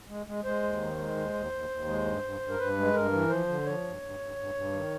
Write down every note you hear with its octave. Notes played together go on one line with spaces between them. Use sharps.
G#3
G#3
G#3 C5
D#2
D#3
G#3
D#2
D#2
D#2
D#2
G#3
G2
G2
G2
A#4
G2 B4
G#3
G2 A#4
E3
F3 C5
D3
F3 C#5
G2
G2
G2
G2
G2
D#3